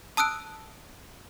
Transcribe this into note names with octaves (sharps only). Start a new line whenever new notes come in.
A5 D#6 E6 F#6 D7